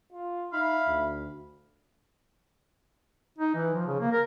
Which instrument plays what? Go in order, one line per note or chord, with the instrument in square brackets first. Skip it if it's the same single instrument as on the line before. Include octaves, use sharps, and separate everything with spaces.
[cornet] F4
[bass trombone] D#4 [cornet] E5 [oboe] F5 [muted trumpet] B5
[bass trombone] D2
[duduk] D#4
E3
F3
C#3
A#3
A#4